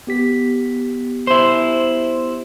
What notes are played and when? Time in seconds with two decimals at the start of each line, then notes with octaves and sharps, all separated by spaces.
0.07 B3 G4 B6
1.27 E4 C5